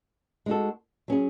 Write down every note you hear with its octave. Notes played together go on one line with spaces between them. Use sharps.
G#3 D#4 F#4 A4
F#3 C#4 G#4